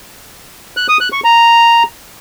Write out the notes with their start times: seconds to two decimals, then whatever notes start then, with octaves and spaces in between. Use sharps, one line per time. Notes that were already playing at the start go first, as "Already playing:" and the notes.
0.77 F#6
0.89 D#6
1.01 F#6
1.12 C#6
1.24 A#5